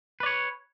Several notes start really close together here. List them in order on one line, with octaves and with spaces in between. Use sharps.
B4 D5 C#5